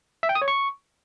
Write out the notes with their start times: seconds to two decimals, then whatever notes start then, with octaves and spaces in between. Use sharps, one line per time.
0.23 E5
0.29 G5
0.35 D#6
0.42 C#5
0.48 C#6